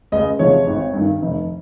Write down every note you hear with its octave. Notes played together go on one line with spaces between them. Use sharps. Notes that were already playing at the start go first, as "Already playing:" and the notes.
C#2 D#5
C3 F3 G#3 C#5
G#1
G2 D#3
F1